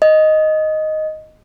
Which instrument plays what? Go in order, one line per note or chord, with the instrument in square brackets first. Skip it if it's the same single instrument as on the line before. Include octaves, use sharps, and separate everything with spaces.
[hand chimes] D#5